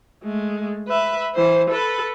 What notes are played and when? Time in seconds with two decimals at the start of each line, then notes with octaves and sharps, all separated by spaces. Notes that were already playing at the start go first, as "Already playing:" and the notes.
0.24 G#3 A3
0.88 B4 E5
1.35 E3 C5
1.70 A4 B4